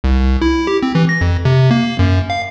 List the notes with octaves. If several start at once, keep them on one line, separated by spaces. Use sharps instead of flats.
C2
E4
G4
C4
E3
A#6
F2
C3
A#3
F#2
F5